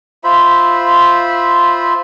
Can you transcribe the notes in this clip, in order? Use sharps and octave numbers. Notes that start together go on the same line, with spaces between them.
F4 C5 E5 B5